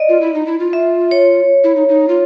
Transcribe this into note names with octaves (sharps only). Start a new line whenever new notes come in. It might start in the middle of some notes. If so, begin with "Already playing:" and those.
Already playing: D5 D#5
F4
E4
D#4
E4
F4
E5
C#5
E4
D#4
D#4
F4